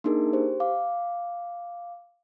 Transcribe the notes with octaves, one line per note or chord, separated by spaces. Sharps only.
A#3 D4 D#4 G#4 A#4
G4 C5
F5 D6